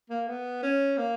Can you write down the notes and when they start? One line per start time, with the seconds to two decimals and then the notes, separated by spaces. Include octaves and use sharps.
0.10 A#3
0.28 B3
0.63 C#4
0.97 A#3